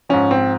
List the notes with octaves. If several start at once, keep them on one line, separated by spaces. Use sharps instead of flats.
G#2 F3 C#4
C4